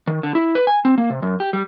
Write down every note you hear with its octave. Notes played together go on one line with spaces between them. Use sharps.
D#3
D3
E4
B4
G#5
C4
A#3
C3
F#2
G4
G3